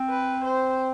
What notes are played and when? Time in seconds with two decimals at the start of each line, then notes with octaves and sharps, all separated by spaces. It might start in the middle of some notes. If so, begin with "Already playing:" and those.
Already playing: C4
0.09 B4
0.44 C5